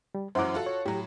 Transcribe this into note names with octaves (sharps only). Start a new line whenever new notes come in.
G3
F#2 E3 F#3 C5 F#5 D6
F4 F#4 A4
C#5
A2 F#3 G4